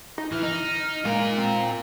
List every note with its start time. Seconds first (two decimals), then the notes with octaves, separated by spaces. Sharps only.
0.18 D#4
0.32 E3 F6
0.43 D#4
1.05 G#3 F4 A#4
1.38 C4